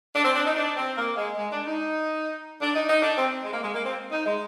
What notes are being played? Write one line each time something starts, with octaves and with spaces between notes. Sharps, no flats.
D4
C4
D4
D#4
D4
C4
A#3
G#3
G#3
D4
D#4
D4
D#4
D#4
D4
C4
G#3
A#3
G#3
A#3
C4
D#4
G#3